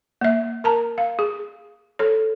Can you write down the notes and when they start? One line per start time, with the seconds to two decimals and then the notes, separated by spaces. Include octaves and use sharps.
0.21 A#3 E5
0.64 A#4 A5 A#5
0.98 F5
1.19 G#4
1.99 A4 C#5